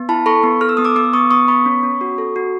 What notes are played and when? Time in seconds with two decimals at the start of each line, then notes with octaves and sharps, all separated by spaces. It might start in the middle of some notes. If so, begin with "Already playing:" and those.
Already playing: B3
0.09 E4 A5 B5
0.26 A4 B5 C#6
0.43 B3
0.61 A4 F6
0.69 E6
0.77 B3 D#6
0.85 D6 E6
0.96 B3 D6 E6
1.13 B3 C#6 D#6
1.31 B3 C#6 D#6
1.48 B3 B5 C#6
1.66 C#4
1.83 C#4
2.01 F#4
2.18 A4
2.36 F#4